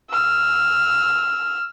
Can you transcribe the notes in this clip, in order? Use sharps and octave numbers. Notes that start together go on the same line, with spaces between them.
E6 F6